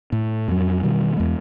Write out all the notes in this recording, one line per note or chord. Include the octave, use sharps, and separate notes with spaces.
A2
F2 F#3
B2 D#3 G3
E2 G#3